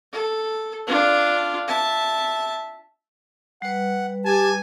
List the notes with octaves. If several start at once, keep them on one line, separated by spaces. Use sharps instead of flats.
A4
D4 F4
E5 A5
G3 B4 F#5
G4 G#5 A5